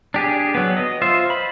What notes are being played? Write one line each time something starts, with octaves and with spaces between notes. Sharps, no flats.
D4 G4 G#4
F#3 B3
D#5
F4 C5 E5
B5